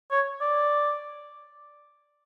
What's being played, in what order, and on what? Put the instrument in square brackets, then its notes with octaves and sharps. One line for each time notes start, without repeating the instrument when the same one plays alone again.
[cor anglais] C#5
D5